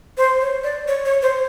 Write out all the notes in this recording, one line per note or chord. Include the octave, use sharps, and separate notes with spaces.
C5
C#5
D5
C#5
C#5
C5